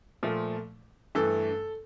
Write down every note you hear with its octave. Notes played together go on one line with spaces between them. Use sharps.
A#2 F3 A3
G2 E3 A3 A4